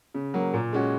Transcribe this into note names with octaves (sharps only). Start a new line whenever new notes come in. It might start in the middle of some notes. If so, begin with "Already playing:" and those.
C#3
F#3 A#3
A#2
G#3 C#4 F#4